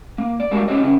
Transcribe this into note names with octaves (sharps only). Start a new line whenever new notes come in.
A#3
D5
G3 G#3 A#3 D4 F#4 G4
C#4 G4 G#4 C#5 D#5
C#3 C#4 E4